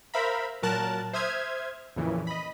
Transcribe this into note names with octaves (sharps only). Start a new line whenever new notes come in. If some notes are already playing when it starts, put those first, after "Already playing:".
A#4 C5 E5 F5 A#5 B5
A#2 F#3 A#4 A5 F#6
C5 E5 D#6 F6 G#6
F2 A#2 C#3 E3
D#5 B5